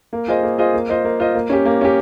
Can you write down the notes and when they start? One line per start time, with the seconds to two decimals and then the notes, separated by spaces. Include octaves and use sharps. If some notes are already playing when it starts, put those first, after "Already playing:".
0.13 A#3
0.28 F4 G#4 C5 D#5
0.43 A#3
0.58 F4 G#4 C5 D#5
0.74 A#3
0.89 F4 C5 D#5
1.04 A#3
1.20 F4 C5 D#5
1.35 A#3
1.50 C#4 G4
1.65 A#3
1.81 C#4 G4